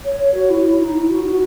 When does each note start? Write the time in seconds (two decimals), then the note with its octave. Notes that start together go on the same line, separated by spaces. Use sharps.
0.04 C#5
0.19 C#5
0.34 F#4
0.49 E4
0.64 E4
0.79 D#4
0.94 E4
1.10 F#4
1.24 F#4